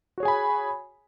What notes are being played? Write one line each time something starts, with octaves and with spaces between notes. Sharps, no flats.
F#4 G#4 C#5 G#5 B5